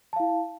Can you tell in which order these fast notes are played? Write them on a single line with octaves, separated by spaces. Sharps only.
A5 F5 E4